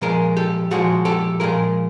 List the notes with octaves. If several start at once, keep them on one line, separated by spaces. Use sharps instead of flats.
A#2 F3 G#3 G#4 A#4
G4 A4
A#2 F3 G#3 F#4 G#4
G4 A4
A#2 F3 G#3 G#4 A#4